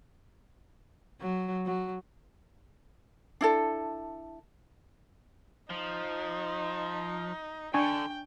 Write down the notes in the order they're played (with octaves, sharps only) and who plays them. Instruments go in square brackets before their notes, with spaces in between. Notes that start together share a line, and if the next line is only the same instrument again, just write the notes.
[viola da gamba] F#3
F#3
[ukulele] D4 E4 A4
[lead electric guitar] F3 [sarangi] D#4
[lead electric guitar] D3 [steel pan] D4 G#5 C#6 [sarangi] G5